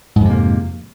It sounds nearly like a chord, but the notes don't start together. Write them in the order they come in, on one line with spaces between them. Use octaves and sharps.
G#2 F2 C3 A#3